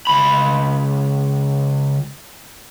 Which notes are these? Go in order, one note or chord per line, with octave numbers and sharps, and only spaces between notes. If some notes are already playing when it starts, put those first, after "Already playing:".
C#2 B5